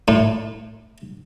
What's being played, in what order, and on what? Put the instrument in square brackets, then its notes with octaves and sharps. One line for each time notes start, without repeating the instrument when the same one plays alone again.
[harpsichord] A2